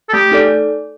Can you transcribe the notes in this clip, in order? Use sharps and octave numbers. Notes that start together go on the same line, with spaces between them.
A4
A3 G4
D#4 A4 D5